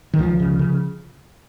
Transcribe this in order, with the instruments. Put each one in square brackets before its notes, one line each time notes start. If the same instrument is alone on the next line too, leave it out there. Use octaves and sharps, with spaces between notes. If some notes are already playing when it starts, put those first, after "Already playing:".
[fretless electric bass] D#3
C#2 F3
C#3
C#3